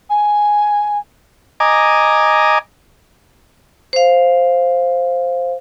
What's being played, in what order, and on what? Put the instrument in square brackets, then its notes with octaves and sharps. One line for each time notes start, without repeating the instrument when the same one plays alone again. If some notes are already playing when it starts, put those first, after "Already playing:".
[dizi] G#5
[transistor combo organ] D#5 G#5 A#5 D6
[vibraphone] C5 F5